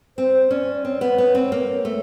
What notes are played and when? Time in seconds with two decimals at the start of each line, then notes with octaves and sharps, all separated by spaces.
0.17 C4 C5
0.51 C#4 D5
0.85 C4 C#5
1.01 B3
1.18 B3
1.35 C4
1.52 A#3
1.85 A3